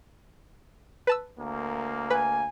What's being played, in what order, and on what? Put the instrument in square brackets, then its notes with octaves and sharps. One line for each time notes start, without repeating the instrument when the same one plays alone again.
[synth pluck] B4 A5 E6
[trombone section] D2 A#3
[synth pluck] B4 [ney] G#5